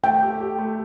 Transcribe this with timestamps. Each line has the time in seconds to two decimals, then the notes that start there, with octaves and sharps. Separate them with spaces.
0.03 A3 G5
0.22 G4
0.40 G4
0.59 A3